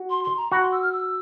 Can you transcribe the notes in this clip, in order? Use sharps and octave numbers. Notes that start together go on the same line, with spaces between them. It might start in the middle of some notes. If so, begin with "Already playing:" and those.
Already playing: F#4
C6
C6
A#5
F#4 B5
C6
E6
F6
E6